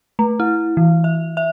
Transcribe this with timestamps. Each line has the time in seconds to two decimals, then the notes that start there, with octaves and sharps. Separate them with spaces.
0.19 A3
0.40 E4
0.77 E3
1.04 E5
1.37 E5